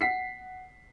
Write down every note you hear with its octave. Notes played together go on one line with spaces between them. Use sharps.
F#5 B6 C7